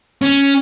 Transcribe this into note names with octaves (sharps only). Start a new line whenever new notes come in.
C#4